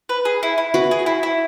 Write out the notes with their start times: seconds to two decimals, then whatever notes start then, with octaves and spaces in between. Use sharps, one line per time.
0.09 B4
0.25 G#4
0.43 E4
0.58 E4
0.74 F#4 B4
0.91 G#4
1.06 E4
1.23 E4